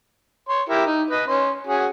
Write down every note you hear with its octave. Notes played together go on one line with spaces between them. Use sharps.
C#5 C6
E4 G4 A#4
D#4
B4 D#5
C#4 C6
C#4 F#4 G#4